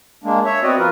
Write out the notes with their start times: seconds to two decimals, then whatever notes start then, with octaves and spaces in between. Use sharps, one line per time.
0.24 G#3 A#3 D4
0.45 C#5 E5
0.63 B3 C4 F#4 D5 D#5
0.78 F3 F4 A#4 B4